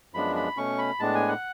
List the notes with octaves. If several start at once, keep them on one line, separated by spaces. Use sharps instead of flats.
F#2 F3 G#3 B3 D4 B5
B5
B2 A3 C#4 C#6
B5
A2 G#3 B3 D4 A5
G#5
F#5